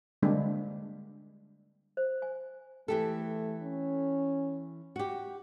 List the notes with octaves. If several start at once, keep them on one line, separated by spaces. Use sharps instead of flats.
D3 G3 G#3 A#3 C4 D4
C5
G#5
E3 A3 G4 A4
C#4
F#4 G4